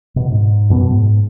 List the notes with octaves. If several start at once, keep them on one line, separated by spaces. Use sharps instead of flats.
B2
G#2
F#2 B2 A#3 B3
G#2